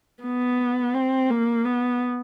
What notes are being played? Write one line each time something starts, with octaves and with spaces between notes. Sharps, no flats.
B3
C4
A#3
B3